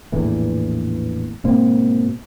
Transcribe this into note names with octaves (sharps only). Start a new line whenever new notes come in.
A#1 E2 A2 E3
G#2 B2 A#3 C4